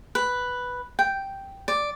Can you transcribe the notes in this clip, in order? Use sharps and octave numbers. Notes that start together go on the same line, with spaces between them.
B4
G5
D5